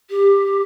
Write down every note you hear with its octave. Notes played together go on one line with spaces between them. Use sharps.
G4